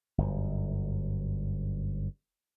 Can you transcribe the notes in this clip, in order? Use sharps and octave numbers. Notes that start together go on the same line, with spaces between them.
G1 F#2